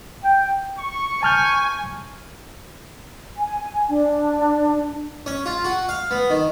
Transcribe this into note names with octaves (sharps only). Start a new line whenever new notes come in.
G5
C#6
G#5 A5 F6 G6
G#5
D4
C#4
F4
F#4
F5
B3
D#3